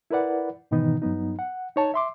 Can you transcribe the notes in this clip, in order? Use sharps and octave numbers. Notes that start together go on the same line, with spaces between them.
E4 A#4 B4 D5 F#5
G#2 B2 D#3 E3 B3 D#4
G2 F#3 B3 D#4
F#5
D#4 C#5 A5
E5 C6 D6